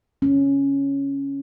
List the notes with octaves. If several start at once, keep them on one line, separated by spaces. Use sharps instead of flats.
C#4